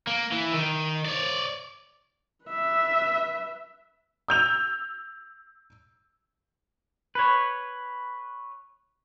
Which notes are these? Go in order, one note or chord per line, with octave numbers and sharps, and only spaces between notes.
A#3
E3
D#3
C#5 D5
B4 E5
E6 G6 F7
B4 C#5